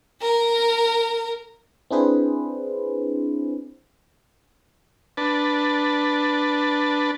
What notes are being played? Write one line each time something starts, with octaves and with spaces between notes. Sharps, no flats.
A#4
C4 D4 E4 G#4 B4 C5
D4 B4 A5